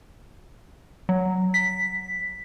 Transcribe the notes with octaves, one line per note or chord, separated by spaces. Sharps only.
F#3
B6